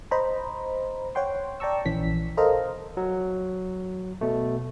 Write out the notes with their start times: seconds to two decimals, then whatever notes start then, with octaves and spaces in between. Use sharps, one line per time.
0.11 C5 D#5 A#5 B5
1.15 C#5 F#5 G5 C6
1.60 D5 G5 A5 A#5 C#6 E6
1.85 A#1 E3 C#4 B6
2.37 A4 A#4 C5 D#5 F5 A#5
2.97 F#3
4.21 B2 A3